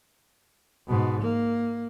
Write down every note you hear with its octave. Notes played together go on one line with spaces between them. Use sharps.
G#2 B2
A#3